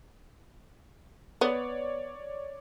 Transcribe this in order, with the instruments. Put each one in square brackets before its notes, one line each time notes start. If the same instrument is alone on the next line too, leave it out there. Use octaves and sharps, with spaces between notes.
[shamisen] B3 [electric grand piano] C#5 D5